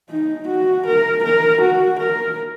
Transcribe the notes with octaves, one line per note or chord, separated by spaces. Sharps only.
D#4
F#4
A#4
A#4
F#4
A#4